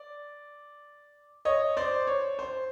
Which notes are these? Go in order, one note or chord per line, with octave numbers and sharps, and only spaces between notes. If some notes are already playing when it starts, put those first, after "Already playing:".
Already playing: D5
C#5 D#5
C5 D5
C#5
C5